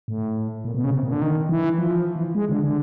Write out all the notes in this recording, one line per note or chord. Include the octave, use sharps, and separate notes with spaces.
A2
A#2
B2
C#3
C3
A#2
D3
D#3
E3
F3
E3
G#3
D3
D3